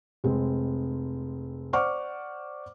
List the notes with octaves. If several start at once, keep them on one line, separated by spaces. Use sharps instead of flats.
F1 G#3 C4
C5 D5 F#5 C#6 D6 F6